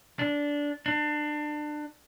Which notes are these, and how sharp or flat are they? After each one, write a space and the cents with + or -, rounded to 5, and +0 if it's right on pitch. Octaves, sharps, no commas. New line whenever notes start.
D4 -15
D4 +25